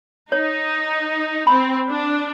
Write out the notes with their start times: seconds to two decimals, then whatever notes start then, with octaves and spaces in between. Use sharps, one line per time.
0.32 D#4 C#5
1.47 C4 B5
1.89 D4